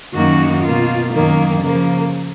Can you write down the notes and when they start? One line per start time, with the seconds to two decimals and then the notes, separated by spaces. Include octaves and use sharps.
0.14 F#2 D#3 A#3 D#4 F#4
0.63 B2 A#3 F4
1.12 F#2 D#3 F#3 A#3
1.61 C#3 F3 A#3